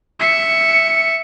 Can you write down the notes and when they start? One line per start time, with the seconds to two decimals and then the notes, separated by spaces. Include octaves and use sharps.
0.20 E5 C#7